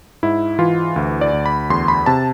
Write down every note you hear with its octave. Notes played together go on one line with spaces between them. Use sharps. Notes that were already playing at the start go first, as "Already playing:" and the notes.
G#2 E4
E3 F4
D2
D5
D2
B5
E2 C6
B5
C3 A5